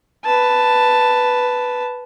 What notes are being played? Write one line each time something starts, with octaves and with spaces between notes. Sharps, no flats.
B4 A5